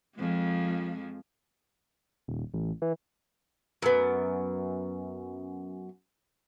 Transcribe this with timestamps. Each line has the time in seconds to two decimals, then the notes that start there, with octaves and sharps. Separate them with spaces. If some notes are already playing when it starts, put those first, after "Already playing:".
0.17 F2 F3 G#3
2.28 D#1
2.54 A1
2.82 E3
3.82 F#2 B3